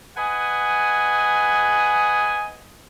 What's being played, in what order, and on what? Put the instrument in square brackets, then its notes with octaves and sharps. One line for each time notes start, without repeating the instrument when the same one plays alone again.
[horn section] B4 D#5 F#5 G#5